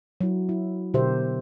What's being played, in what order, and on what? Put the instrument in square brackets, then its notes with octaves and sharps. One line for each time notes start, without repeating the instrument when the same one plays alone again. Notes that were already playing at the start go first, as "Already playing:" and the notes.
[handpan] F#3 E4
E4
B2 D3 G4 A#4 C5 E5